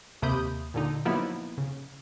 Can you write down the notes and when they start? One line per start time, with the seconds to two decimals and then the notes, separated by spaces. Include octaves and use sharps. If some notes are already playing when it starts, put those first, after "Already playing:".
0.22 D#2 C3 A#3 B5 D#6 G6
0.74 A#2 D3 D#4
1.05 F3 F#3 A#3 B3 D#4 E4
1.58 C#3